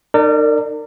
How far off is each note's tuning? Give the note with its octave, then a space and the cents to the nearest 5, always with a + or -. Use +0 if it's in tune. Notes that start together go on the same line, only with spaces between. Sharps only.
D#4 -40 A#4 -35 D5 +0